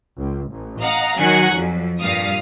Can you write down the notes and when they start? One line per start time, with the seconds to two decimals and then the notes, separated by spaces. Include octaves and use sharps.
0.18 C#2
0.51 A1
0.81 D#5 F5 F#5 A#5
1.18 D#3 F#3 F#5 G#5 F#6 C#7
1.53 F2
1.99 G2 A#2 F5 D#6